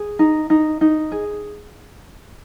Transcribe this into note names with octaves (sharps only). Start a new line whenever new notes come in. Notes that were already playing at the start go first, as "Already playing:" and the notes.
Already playing: G#4
D#4
D#4
D#4
G#4